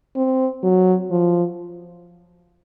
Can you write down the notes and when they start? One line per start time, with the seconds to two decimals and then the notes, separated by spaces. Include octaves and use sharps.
0.16 C4
0.63 F#3
1.11 F3